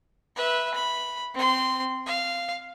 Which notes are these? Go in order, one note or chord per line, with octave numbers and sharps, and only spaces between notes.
B4 E5
B5
C4 C6
F5